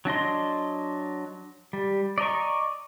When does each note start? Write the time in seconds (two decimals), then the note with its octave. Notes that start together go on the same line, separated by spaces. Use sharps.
0.05 F#3 D4 D#5 C6
1.73 G3
2.18 D5 D#5 A#5 C#6